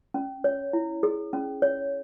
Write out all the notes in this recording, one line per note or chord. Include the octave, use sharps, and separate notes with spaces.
C#4
C#5
E4
G#4
C#4
C#5